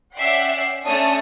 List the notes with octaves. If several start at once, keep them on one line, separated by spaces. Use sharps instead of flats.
C#4 D5 E5 F#5 G5 C7
A3 C#4 D4 A5 D#6